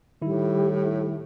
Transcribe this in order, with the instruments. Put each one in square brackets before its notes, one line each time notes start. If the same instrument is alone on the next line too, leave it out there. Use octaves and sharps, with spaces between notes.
[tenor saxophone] A2 [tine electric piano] D#3 E4 [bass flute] G3